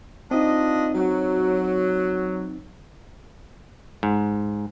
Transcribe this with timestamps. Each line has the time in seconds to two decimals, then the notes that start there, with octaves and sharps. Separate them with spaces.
0.31 C4 D4 D#4 F4 D#5
0.95 F#3
4.03 G#2